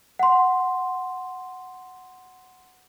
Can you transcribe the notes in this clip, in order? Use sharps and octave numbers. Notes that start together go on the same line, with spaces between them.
F#5 C6